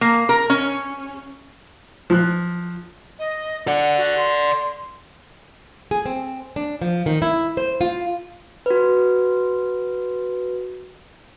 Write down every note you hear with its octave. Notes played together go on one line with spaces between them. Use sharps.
A#3
A#4
C#4
F3 F#6
D#5
A4 D5 F#5
F#4
C6
G#4
C4
D4
F3
D#3
E4
C5
F4
F#4 B4